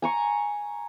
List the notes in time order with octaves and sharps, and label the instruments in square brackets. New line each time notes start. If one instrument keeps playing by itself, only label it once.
[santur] G#5 A#5 C#6